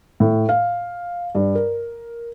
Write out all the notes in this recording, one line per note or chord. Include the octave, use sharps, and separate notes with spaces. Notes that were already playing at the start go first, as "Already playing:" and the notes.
A2
F5
G2
A#4